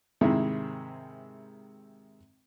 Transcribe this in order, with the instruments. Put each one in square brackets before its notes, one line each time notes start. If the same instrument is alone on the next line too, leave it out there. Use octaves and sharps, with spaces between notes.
[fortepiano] G#2 C3 D#3 G#3 E4